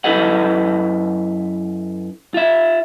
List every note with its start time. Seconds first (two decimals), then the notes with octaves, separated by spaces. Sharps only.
0.04 F#2 E4 A4 B4 D#5 F#5
2.34 F4 E5